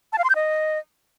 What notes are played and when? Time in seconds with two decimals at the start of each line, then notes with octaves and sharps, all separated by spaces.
0.13 A5
0.18 F5
0.24 C6
0.30 G6
0.35 D#5